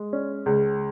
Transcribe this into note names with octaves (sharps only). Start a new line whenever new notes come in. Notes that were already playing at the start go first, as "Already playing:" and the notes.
Already playing: G#3
C#4
C#2